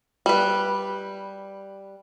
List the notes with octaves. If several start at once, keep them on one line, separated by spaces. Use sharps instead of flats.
G3 B4